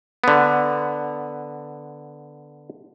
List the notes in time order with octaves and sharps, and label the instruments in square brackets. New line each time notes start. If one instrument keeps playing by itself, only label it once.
[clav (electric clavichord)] D3 B3